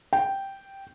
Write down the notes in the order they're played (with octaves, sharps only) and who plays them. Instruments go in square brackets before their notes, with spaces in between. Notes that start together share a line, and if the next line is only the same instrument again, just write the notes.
[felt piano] G5